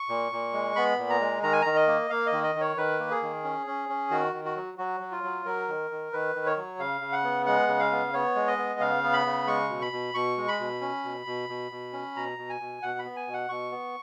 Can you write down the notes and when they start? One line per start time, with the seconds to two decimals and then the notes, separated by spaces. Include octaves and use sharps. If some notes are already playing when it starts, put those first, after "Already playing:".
Already playing: C#6
0.09 A#2
0.32 A#2
0.53 G#3
0.76 B3 B5
0.98 A#2
1.10 A#5
1.20 G#3
1.43 D#3 A#5
1.53 G#5
1.62 D#3 A#5
1.76 D#5
1.87 A#3
2.10 A#3 F5
2.26 D#5
2.32 D#3
2.44 D#5
2.55 D#3
2.61 C#5
2.77 D#3 B4
3.00 A#3
3.11 G#4
3.22 D#3
3.44 C#4
3.67 C#4
3.89 C#4
4.11 D#3 F#4
4.33 D#3
4.45 F#4
4.56 F#3
4.78 F#3 F#4
5.00 F#3
5.12 F4
5.24 F#3
5.45 F#3 A#4
5.68 D#3
5.91 D#3
6.13 D#3 B4
6.35 D#3
6.46 C#5
6.57 F#3
6.79 C#3 F5
7.01 C#3
7.12 F#5
7.24 B3
7.46 G#3 F#5
7.68 C#3
7.79 F5
7.92 B3
8.13 B3 C#5
8.35 G#3
8.48 D#5
8.58 B3
8.80 C#3 F5
9.03 B3
9.13 B5
9.26 C#3
9.47 G#3 C#6
9.69 B2
9.82 B5
9.92 B2
10.14 B2 C#6
10.37 G#3
10.48 B5
10.60 B2
10.81 C#4
11.04 B2
11.26 B2
11.49 B2
11.72 B2
11.93 C#4
12.16 B2 A#5
12.38 B2
12.49 G#5
12.61 B2
12.82 B2 F#5
12.99 B5
13.05 B3
13.16 G#5
13.28 B2
13.34 F#5
13.49 B2 C#6
13.71 B3